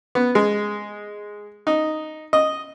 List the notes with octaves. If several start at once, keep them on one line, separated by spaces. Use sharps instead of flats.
B3
G#3
D#4
D#5